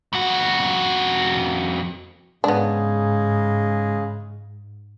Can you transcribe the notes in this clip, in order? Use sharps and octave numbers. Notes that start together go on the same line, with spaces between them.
F2 F#4
G#2 C#3 G#3 B3 D4